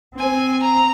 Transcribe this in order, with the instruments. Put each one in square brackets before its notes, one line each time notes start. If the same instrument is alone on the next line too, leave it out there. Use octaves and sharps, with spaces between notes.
[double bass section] C4 [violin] G#5
[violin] A#5